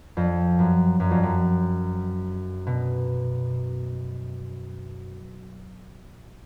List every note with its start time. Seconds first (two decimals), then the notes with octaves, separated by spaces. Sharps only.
0.17 F2
0.59 F#2
1.00 F#2
1.11 F2
1.23 F#2
2.67 B2